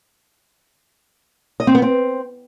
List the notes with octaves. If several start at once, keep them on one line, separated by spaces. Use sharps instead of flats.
D#5
C4
B3
C4